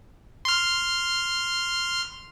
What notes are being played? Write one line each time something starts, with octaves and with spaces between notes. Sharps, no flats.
C6 F6